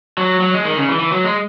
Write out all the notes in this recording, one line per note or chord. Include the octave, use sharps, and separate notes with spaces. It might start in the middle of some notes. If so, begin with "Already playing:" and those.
F#3
F#3
G#3
D#3
C#3
E3
E3
F#3
G#3